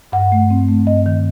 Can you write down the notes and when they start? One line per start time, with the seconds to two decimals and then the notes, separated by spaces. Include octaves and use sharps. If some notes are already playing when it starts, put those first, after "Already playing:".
0.12 G2 F#5
0.32 A3
0.50 C4
0.68 A3
0.87 G2 D#5
1.06 D#3